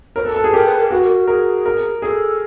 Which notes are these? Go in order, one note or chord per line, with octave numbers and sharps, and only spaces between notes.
A#4 C#5
A4 B4
A4
G#4
G4 A#4
B4
A#4
F#4 B4
A#4
G#4 A#4
A#4
G#4 A4 A#4